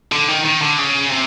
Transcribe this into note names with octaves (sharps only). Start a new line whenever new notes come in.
D3
D#3
D#3
D3
C#3
C3